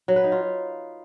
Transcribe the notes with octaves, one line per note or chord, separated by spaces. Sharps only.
F#3
B4
D#4
F4